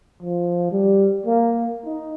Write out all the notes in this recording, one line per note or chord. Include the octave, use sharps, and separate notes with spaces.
F3
G3
A#3
D#4